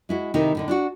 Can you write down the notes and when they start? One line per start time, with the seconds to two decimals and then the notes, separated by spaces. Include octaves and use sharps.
0.09 G#3 E4 F#4
0.34 C3 D#3 A3 D#4 E4
0.55 A2 D3 D#4
0.68 D4 F4 F#4